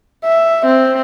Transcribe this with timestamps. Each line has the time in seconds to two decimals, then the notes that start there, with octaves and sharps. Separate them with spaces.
0.24 E5
0.66 C4